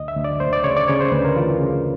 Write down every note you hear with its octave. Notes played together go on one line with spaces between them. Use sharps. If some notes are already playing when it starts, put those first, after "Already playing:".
Already playing: D2 D#5
E5
D2
D5
D2 C5
D5
C#3 C#5
D5
C#3 C#5
C5
D2 B4
A#4
E3 F4
C#3